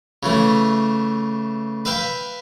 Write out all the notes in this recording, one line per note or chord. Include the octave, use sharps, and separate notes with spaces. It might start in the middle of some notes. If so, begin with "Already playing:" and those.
C#3 E3 A3
B4 E5 F5 G5